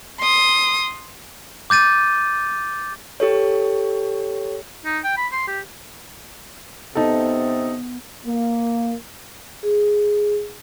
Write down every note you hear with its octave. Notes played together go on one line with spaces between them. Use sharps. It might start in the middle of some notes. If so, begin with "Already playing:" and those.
C6 D#6
D6 G6 A6 D#7
G4 A4 C#5
D#4
G5
B5
C6
G4
C3 B3 D#4 A4
A#3
G#4